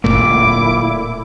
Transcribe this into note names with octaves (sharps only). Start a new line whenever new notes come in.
D1 D#2 A#2 A3 E4 D6